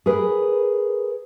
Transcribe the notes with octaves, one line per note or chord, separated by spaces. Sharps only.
G#4 A#4 B4